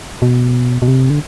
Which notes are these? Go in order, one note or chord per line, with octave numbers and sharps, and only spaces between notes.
B2
B2
C3
D3